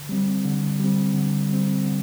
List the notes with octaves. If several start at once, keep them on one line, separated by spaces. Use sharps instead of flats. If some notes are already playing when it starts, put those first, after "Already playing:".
Already playing: D3
G3 C4
D3
G3 C4
D3
G3 C4
D3